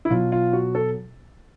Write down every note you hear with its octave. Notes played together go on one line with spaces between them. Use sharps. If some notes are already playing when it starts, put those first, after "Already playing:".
E4
B2 F#3 F4
F4
F#4
A4